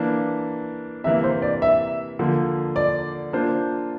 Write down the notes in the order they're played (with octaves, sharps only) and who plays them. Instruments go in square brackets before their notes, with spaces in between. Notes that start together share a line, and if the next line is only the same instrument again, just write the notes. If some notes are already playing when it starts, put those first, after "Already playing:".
Already playing: [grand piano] E3 A#3 D4
[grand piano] C3 E3 A#3 [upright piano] E5
[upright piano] C5
D5
E5
[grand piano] D3 F3 A#3
[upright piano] D5
[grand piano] A#3 D4 F4 C5